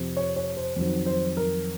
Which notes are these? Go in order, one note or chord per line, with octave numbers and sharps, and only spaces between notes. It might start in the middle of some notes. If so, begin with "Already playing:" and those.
Already playing: F2 C3 F3
C#5
C#5
C5
F2 D#3 F#3 C5
C5
A#4